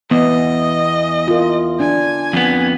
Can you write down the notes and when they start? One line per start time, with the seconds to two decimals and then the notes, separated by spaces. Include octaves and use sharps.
0.11 E2 B3 D#5
1.28 F4 A#4
1.80 D4 G#5
2.33 F2 B3